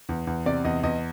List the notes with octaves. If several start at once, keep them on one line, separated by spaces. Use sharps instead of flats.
E2
E2
C3 D5
E2 D#5
E2 D#5